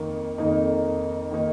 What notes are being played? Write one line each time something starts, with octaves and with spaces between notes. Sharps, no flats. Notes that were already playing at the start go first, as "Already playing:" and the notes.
Already playing: F2 D#3 A#3 D#4
F2 D#3 A#3 D#4
D#3 A#3 D#4